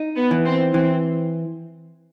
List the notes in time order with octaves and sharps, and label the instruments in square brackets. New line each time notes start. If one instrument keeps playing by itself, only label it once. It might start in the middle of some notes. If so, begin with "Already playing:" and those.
Already playing: [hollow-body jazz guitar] D#4
[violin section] B3
[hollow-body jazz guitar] E3
[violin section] C4
[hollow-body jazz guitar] E3 [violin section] C4